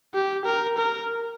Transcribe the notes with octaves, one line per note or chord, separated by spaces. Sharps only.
G4
A#4
A#4